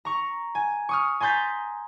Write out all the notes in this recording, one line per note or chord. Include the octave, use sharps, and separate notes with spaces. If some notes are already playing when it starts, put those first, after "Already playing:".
A#5 C#6
G#5
C#6 D#6 F6
G#5 A#5 C6 G6 A6 B6